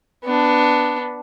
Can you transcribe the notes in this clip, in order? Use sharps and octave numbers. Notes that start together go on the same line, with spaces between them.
B3 D4